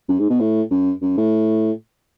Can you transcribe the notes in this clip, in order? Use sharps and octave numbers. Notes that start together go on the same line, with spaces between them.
F#2
G#2
B2
A2
F#2
F#2
A2